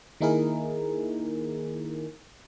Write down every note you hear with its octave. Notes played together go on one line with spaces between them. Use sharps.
D#3 A#3 D#4 E4 G#4 A#4